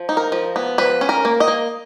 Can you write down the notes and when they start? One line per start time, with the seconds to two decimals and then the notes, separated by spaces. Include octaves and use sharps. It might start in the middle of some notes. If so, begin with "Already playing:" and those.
Already playing: F3
0.09 D#4
0.17 A#4
0.32 F3
0.56 B3
0.78 F3 B4
1.01 C#4
1.09 A#4
1.25 A#3
1.40 D#5
1.48 A#3